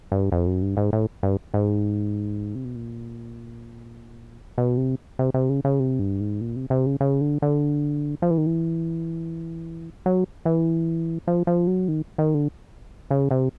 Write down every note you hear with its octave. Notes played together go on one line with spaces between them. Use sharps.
G2
F2
F#2
G2
G#2
A2
G2
G#2
C3
B2
A#2
B2
C3
C3
C3
C#3
C#3
C3
G2
G#2
A#2
C3
C3
C#3
C#3
D3
D3
F3
E3
D#3
E3
F#3
E3
F3
F3
F#3
D#3
D#3
D3
C#3
C3